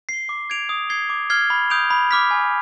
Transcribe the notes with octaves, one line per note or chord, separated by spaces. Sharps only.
C7 G7
D6
G#6 D7 F7
D#6
G#6 C7 G7
D6
F6 G#6 C7 G7
B5
D#6 G6 D7 F7
B5
D6 F6 B6
G#5